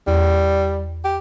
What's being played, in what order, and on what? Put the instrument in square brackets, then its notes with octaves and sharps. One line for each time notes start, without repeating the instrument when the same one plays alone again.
[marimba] E2 [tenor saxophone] G3
[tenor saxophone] G4